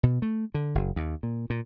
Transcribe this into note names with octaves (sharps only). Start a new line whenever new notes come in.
B2
A3
D3
F#1
D#2
A#2
A#2